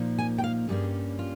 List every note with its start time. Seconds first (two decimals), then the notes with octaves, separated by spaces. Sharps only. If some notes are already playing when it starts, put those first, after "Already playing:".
Already playing: A#2 F3 A#3 D#4
0.18 G#5
0.38 G5
0.44 F5
0.69 G2 G3 A#3 C#4 G#4
1.19 F4